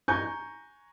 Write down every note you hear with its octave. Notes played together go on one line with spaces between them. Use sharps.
G#5 A#5 C#6 G6